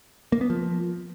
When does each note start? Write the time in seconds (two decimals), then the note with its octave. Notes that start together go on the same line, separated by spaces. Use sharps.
0.32 A#3
0.41 B3
0.50 F3